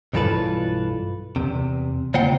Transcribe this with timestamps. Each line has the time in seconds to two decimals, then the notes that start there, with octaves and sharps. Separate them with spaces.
0.13 B1 G2 E3 F4 A4 B4
1.36 E2 C3
2.14 C#3 A#3 C4 F4 F#5 G5